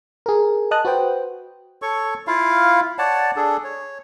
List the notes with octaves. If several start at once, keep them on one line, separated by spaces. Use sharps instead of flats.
G#4 A#4
D#5 A5 D#6 F#6
F#4 B4 C5 G5
A4 C#5 C#6
E4 F4 F5
C#5 D5 F#5 A5
D4 G#4 A4
C#5